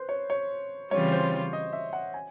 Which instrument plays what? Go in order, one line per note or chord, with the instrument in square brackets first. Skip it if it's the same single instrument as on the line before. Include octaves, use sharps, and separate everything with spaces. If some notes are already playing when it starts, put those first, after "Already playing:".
Already playing: [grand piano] B4 C5
C#5
C#5
[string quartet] C#3 E3 G3 C4 F4 [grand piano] C#5
[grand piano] C5
D#5
E5
F#5
G#5